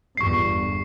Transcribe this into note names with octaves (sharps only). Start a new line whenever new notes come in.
G1 E2 G2 C#6 C7